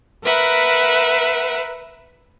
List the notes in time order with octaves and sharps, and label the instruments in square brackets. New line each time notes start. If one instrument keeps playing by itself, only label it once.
[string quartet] A#4 B4 E5 F#5